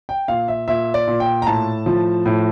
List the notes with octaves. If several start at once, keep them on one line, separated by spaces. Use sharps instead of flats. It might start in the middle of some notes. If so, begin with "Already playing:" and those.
G5
A#2 F5
E5
A#2 E5
D5
A#2
G5
A#5
A2 A5
F3
A2